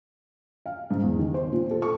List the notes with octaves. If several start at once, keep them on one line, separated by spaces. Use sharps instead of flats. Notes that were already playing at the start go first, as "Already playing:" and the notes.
F5
G#2
E2
D#3
C5
A#2
A4
C#6